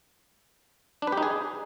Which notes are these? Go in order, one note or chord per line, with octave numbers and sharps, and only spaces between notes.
D4
B4
G4
D#4
G#4